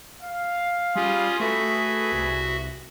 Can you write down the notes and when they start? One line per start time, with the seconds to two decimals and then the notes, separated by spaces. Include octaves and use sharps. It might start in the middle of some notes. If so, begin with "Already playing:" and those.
0.21 F5
0.96 G3 C#4 F4 G#4
1.40 A3 F#4 G#4 B4 E5
2.12 C2